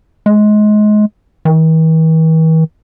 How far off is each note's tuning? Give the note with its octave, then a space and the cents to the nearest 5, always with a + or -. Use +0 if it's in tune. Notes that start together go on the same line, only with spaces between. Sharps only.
G#3 +25
E3 -45